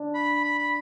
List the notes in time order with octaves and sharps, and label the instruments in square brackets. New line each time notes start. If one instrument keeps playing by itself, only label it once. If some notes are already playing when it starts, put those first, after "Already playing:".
Already playing: [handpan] D4
[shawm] B5
B5
B5